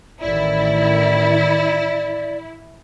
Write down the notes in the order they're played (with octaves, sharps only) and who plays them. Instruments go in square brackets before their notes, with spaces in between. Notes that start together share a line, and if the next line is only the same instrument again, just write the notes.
[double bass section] A1 A2 D#3 [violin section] E4 [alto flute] D5